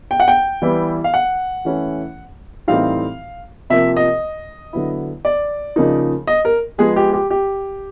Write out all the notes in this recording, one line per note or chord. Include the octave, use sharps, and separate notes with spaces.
G5
F#5
G5
E3 G3 B3 E4
F5
F#5
E3 A3 C#4 E4
A2 E3 G3 C4 D#4 F5
C3 F3 A#3 E5
D#5
D3 F#3 B3 E4
D5
C#3 F3 A#3 D#4
D#5
A#4
F3 G#3 B3 G#4
G4
G4
G4